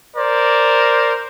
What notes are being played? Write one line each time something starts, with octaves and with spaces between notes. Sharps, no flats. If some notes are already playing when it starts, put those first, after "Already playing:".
A#4 C5 D5